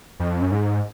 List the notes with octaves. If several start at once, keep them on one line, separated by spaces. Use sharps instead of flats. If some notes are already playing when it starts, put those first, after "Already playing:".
F2
F#2
G#2